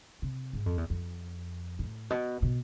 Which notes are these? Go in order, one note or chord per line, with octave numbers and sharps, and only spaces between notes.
C3
G#2
F2
E2
F2
A2
B2
B2